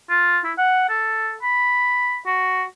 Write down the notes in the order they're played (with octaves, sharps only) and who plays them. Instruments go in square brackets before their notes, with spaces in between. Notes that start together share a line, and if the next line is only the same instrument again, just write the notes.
[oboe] F4
E4
F#5
A4
B5
F#4